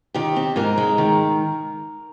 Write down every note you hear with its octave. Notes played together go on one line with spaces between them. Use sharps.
D#3 G4
C4
G#2 A#4
G#3
D#3